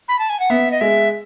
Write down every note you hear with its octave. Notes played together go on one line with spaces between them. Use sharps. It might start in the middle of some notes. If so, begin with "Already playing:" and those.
B5
A5
G#5
F#5
B3 E5
D#5
G#3 E5